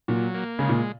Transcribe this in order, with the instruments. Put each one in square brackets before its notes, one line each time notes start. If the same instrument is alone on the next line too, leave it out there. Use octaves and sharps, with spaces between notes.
[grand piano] A#2 [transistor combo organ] F#3
[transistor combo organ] A#3
[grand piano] C#3 [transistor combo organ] G#3
[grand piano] A#2